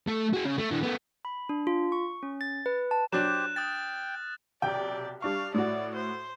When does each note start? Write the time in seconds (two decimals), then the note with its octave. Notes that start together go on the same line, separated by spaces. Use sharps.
0.08 A3 A4
0.34 F#4 G#4
0.45 C#3
0.58 A3
0.71 E3 D4
0.83 A3 B3
1.25 B5
1.49 D4
1.67 F4
1.92 C#6
2.23 C#4
2.41 A6
2.66 B4
2.91 A5
3.12 F#3 D4 G4 C5 F#6 E7
3.56 G5 D#6 F6 A6
4.62 B1 C3 D5 G5
5.22 G3 D4 F5 C#6
5.54 A2 F#4 D5
5.95 C5